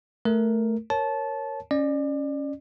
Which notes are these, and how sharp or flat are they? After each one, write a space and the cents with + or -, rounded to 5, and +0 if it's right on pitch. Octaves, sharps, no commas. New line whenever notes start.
A3 +0 A#4 +0
A#4 +0 C#5 -10 A5 -20
C#4 +0 D5 +30